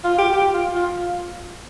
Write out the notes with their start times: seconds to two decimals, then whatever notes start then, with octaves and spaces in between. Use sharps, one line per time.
0.04 F4
0.18 G4
0.33 G4
0.54 F4
0.75 F4
0.97 F4